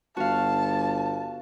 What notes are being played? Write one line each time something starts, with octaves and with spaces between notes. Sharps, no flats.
G1 F#4 F5 A5